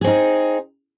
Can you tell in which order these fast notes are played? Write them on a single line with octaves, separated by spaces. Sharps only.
G#4 C4 D#4